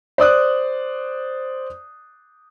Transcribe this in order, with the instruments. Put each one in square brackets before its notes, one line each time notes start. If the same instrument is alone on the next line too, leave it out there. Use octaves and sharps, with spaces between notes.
[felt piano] C5 D5 D#6 F#6